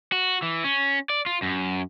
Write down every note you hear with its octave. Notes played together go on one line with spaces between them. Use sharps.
F#4
E3
C#4
D5
F4
F#2